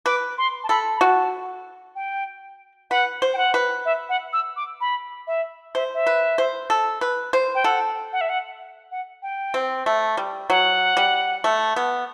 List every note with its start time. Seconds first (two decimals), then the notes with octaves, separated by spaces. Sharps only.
0.06 B4 D6
0.38 C6
0.64 A5
0.69 A4 B5
0.97 B5
1.00 F#4 A5
1.95 G5
2.91 B4 F#5
3.22 C5
3.34 G5
3.38 F#5
3.54 B4
3.85 E5
4.09 F#5
4.33 E6
4.56 D6
4.81 B5
5.27 E5
5.75 C5 E5
5.94 E5
6.06 B4
6.38 C5
6.70 A4
7.01 B4
7.33 C5
7.55 G5
7.64 A4 F#5
8.13 F#5
8.21 E5
8.29 F#5
8.91 F#5
9.22 G5
9.54 C4
9.86 A3
10.17 G3
10.50 F#3 F#5
10.97 G3
11.44 A3
11.76 B3